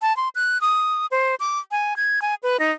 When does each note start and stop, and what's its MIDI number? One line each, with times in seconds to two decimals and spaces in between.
0.02 0.16 81
0.17 0.29 84
0.35 0.61 90
0.61 1.06 87
1.11 1.35 72
1.40 1.59 86
1.71 1.96 80
1.96 2.20 92
2.22 2.35 80
2.43 2.57 71
2.60 2.72 63